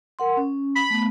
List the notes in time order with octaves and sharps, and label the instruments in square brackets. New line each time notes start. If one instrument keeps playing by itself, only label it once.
[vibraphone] A#4 F#5 C6
C#4
[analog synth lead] B5
[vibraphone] A3 B3